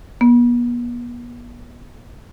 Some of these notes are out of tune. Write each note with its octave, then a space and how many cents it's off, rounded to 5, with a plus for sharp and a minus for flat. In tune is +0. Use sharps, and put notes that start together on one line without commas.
B3 -40